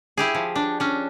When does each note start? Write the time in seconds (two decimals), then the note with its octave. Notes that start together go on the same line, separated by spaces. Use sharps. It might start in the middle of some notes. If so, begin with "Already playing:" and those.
0.17 E4 G4 G#4
0.35 F3
0.56 D4
0.80 C#4 D4